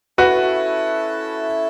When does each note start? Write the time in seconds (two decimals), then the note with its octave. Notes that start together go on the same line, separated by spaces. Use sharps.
0.18 C#4 E4 F#4 A4 B4 E5 A5